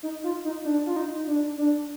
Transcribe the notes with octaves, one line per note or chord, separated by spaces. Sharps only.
D#4
F4
D#4
D4
F4
D#4
D4
D4